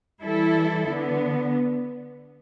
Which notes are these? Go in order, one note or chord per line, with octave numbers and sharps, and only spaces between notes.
E3 G3 E4 A4
D3 B3